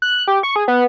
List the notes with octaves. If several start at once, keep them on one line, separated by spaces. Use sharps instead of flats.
F#6
G4
C#6
G#4
B3